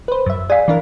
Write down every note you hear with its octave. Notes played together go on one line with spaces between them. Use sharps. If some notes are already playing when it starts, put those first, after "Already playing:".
B4 C5
F#2 E5
G#4 D5 F5
E3 D4 A#4